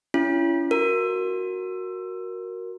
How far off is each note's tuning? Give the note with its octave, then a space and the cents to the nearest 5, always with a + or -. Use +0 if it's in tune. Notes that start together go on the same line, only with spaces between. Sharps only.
C#4 +25 E4 +35
F#4 -5 A#4 +0